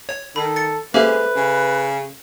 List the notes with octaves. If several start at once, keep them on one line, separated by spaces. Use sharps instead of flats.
C#5
D#3 A4 B5
A6 C#7
G#3 A#3 C#4 G4 A4 B4 C5 E5
C#3